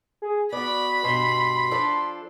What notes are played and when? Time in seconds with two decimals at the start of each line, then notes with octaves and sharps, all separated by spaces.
0.22 G#4
0.52 B3 F#4 D5 B5
1.03 G2 B2 C6
1.71 F3 D4 A4